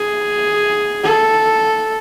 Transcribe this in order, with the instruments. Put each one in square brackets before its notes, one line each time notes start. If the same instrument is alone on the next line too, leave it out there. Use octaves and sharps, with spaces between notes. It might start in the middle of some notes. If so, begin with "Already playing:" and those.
Already playing: [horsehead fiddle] G#4
A4